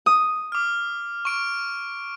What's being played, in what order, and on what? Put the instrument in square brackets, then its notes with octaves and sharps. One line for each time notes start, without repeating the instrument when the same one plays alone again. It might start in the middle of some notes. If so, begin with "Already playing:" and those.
[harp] D#6
[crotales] D6 F6
C#6 D7